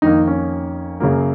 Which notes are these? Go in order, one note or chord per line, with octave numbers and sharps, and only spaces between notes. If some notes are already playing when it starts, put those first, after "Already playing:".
F2 D#3 A#3 D#4
C#4
F#2 C#3 F#3 A#3